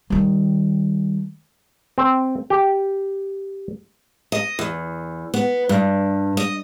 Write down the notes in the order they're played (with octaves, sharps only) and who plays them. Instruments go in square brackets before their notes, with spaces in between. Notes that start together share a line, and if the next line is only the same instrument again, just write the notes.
[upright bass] D#3 G3
[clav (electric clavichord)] C4
G4
[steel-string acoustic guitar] D#5
E2
B3
G2
D#5